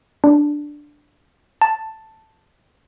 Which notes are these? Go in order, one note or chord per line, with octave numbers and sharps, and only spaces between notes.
D4
A5